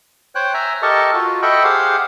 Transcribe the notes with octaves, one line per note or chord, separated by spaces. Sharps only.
C5 C#5 G5 F#6
E5 G#5 A#5
G4 A4 A#4 D#5 A5 C#6
F4 F#4
A4 D#5 E5 G5 B5 C#6
G4 G#4 C5 F5 F#5